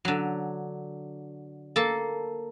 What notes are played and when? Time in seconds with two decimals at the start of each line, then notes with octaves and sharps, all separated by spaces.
0.05 D3 F#3
1.76 A#3 A4